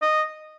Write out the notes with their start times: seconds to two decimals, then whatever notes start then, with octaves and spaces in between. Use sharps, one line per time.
0.02 D#5